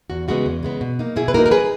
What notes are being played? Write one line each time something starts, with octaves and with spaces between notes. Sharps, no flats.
E2 F#4
C#3 G#3 B3 F#4
E2
C#3 G#3 B3
B2
A#3 D#4
B2 E4 G#4
B4
A#3 D#4 F#4 A#4
A#4
G#4 B4